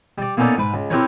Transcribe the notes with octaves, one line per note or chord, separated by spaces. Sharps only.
G3 D5
A#3 B3 C#4 D#4 A4 D5
G#2 B4
C#2
C4 E4 G4 A#4 B4 C#5